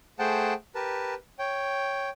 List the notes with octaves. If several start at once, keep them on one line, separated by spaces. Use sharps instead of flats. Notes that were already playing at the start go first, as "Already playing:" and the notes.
A3 G#4 C5 F#5 G5 A5
G4 A#4 B4 A5
C#5 G5